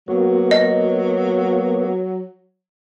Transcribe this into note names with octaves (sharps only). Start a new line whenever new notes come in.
F#3 A#3 B3 F#4
D#5